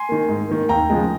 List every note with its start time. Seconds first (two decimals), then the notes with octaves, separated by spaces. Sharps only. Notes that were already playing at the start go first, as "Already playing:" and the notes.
Already playing: G#5 C6
0.09 D#3 A#3
0.29 G#2
0.49 D#3 A#3
0.69 D#2 G5 A#5
0.90 C#3 F3 G#3